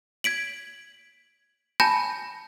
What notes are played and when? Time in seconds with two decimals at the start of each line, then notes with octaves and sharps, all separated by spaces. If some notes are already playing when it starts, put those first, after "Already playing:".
0.24 G#6 B6 D7 F#7
1.80 G#5 A5 B5 G6 A#6